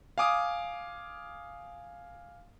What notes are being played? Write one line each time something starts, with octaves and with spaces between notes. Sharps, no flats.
F5 G#5 D6 D#6